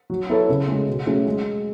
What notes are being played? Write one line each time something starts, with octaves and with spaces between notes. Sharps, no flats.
F#3
B3 E4 A4 C#5
C#3
G#3 C#4
B2
F#3 A3 C#4 G#4
G#3